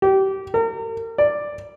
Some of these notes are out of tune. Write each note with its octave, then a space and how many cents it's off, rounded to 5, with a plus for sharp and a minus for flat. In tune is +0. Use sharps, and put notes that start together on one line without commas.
G4 -25
A#4 -40
D5 +5